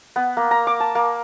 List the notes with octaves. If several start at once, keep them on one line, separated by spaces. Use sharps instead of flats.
B3
A#3
A#5
D6
A5
A#3